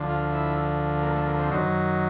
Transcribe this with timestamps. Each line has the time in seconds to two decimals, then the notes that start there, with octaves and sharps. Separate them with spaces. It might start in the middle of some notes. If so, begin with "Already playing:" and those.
Already playing: D2 D3 F3
0.09 F4
0.32 E4
1.03 A#3
1.15 A3
1.26 A#3
1.39 C4
1.50 F#2 D#3 F#3